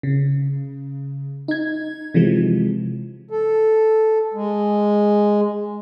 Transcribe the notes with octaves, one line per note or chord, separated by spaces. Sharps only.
C#3
D#4 G#6
C3 E3 F3 G#3
A4
G#3